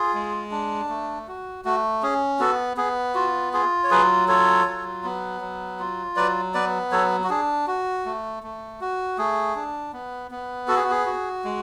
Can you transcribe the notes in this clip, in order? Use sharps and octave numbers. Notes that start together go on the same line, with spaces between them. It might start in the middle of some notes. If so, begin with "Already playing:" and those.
Already playing: F4 G#4
G#3
D4
A3
F#4
A3 F#4
C#4 G#4
B3 F#4 A4
B3 G#4
F4 F#4
F4 G#4
C#5
F#3 G#4 B4
F4 A4 C#5
F#3
B3
F#3
F4
F#3 B4 D5
B3 B4 D5
F#3 A4 C#5
F#4
D4 G#4
F#4
A3
A3
F#4
A3 G#4
D4
B3
B3
F#4 A4
G#4
F#4
G#4
F#4
G#3